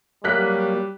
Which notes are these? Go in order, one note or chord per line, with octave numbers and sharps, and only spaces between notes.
F#3 G3 A#3 F6 F#6 B6